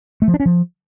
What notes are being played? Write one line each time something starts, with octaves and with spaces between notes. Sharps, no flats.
A3
F3
D4
C#4
F3